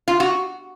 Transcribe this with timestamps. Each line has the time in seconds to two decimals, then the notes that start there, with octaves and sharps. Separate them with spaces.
0.08 F4
0.20 F#4